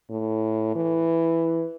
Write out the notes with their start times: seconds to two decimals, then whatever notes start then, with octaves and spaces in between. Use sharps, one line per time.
0.10 A2
0.76 E3